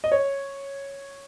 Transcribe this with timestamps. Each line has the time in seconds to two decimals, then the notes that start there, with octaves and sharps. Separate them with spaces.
0.04 D#5
0.12 C#5